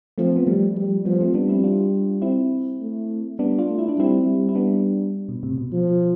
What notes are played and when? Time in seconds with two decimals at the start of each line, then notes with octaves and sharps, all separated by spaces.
0.18 F3 A3 C4
0.36 B3
0.47 F3 G3 A3
0.77 G3
1.05 F3 G3 B3
1.21 A3 C4
1.35 G3 B3 D4
1.49 C4 E4
1.64 D4 F4
2.22 C4 E4
2.81 A3
3.38 G3 B3 D4
3.58 D4 F4
3.69 A3
3.78 E4
3.89 D4
3.97 G3 C4 E4
4.26 G3
4.49 E4
4.55 B3 D4
5.29 B2
5.43 A2 C3
5.58 B2
5.72 F3